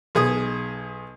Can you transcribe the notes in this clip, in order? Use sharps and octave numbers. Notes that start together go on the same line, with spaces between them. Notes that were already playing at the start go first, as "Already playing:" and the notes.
B1 G#4 D#6